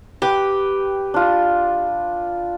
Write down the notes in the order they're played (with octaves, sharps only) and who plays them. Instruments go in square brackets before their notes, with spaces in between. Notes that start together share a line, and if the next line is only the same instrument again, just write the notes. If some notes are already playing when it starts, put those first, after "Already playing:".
[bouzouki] G4 [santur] B4 G5
[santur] D4 F4